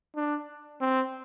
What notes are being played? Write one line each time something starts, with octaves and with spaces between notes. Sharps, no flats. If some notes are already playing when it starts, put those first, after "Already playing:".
D4
C4